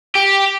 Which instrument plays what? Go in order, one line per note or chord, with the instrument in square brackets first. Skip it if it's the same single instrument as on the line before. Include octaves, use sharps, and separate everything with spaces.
[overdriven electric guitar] G4